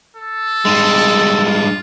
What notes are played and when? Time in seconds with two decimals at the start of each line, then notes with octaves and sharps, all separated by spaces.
0.17 A4
0.65 G2 G#3
1.46 F4